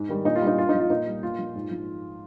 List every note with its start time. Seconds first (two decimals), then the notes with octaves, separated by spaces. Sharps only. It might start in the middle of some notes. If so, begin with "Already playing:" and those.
Already playing: G#2
0.09 D#3 G3
0.25 A#2 D#4
0.36 F4
0.41 G3
0.47 D#4
0.57 G2 F4
0.69 D#4
0.74 F3
0.80 F4
0.90 A#2 D#4
1.06 G3
1.23 A#2 F4
1.39 F3
1.55 G#2
1.71 F3